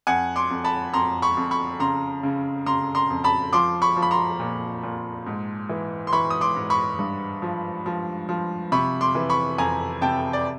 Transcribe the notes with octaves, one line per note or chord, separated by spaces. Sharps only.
F2 F#5 G#5
C6 D6
F2
A5 B5
F2 A#5 C6
B5 C#6
F2
B5 C#6
C#3 A#5 C6
C#3
C#3 A#5 C6
A#5 C6
F2
A5 B5
F3 C6 D6
B5 C#6
F3
B5
A#5 C6
A#2
A#2
G#2
E3
C6
E3 B5 C#6
D#6
C6 D6
G#2
B5 C#6
G2
F3
F3
F3
C3 B5 C#6
C6 D6
E3
B5 C#6
F2 G#5 A#5
C3 G5 A5
D5